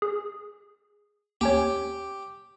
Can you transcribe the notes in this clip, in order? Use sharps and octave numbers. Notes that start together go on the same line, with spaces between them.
G#4
D#2 C#4 G4 C#5